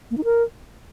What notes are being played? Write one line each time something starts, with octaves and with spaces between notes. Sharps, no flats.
A#3
D#4
A#4